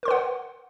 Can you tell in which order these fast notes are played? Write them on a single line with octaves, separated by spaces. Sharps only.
A#4 C6 B4 F#5